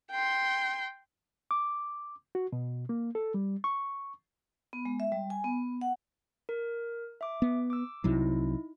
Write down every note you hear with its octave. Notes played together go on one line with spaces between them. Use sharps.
G5 C6
D6
F#4
B2
A#3
A4
G3
C#6
B3
G#3
E5
G3
G#5
B3
F#5
A#4
E5 D6
B3
D6 E6
C2 C3 F#3 D#4 E4